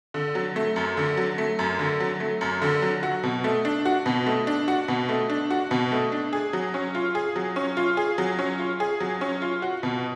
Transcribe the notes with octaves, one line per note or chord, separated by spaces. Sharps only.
D3
F#3
A3
F#2
D3
F#3
A3
F#2
D3
F#3
A3
F#2
D3
F#3
F#4
B2
A3
D4
F#4
B2
A3
D4
F#4
B2
A3
D4
F#4
B2
A3
D4
G#4
F#3
C#4
F4
G#4
F#3
C#4
F4
G#4
F#3
C#4
F4
G#4
F#3
C#4
F4
F#4
B2